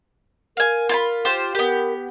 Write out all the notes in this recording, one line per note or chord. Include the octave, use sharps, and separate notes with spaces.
A#4 F5 G#5
F4 G#5 B5
F4 G4 C5
B3 G4 A#4